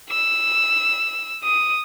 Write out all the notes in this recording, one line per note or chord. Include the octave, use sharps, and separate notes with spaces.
E6
D#6